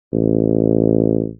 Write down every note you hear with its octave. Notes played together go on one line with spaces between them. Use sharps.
A1